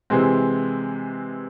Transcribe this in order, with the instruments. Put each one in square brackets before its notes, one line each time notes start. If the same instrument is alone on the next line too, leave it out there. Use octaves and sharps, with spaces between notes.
[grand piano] C3 E3 G#3 C4